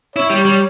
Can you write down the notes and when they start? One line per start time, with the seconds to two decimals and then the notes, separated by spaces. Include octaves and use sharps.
0.16 E4 C#5
0.30 G3
0.45 G3